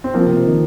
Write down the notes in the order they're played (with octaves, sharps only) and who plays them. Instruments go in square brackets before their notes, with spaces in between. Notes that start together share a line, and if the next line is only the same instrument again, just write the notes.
[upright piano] C4
F3 A#3
[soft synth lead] C3
C3
D#3